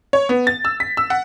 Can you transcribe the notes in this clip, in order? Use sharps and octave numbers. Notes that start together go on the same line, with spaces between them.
C#5
B3
A6
E6
B6
E6
F#5